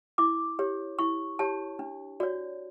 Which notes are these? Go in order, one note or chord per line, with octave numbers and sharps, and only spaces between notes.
E4 D6
G4 C#5
E4 C#6
G4 C#5 A5
D4
F#4 C#5 D5